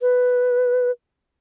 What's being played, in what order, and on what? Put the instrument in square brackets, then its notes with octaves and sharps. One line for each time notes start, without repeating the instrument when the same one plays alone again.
[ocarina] B4